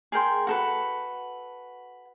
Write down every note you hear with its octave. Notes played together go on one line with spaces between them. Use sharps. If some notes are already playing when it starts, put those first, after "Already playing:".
G#4 A#4 G5 C6
F#4 A4 B4